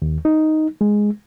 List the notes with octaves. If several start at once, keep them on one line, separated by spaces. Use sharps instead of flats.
D#2
D#4
G#3